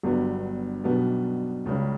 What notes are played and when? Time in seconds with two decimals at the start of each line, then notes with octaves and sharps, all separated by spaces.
0.03 G1 G2 F#3 B3
0.84 B1 B2 G3 B3 D4
1.65 C#2 C#3 G3 C#4